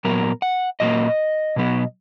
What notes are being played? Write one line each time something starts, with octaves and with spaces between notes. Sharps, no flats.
A#2 F#3 B3 A#4
F#5
A#2 F#3 A#3 D#5
B2 F#3 B3